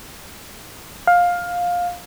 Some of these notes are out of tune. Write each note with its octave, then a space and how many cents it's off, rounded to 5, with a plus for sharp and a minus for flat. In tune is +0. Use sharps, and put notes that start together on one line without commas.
F5 +15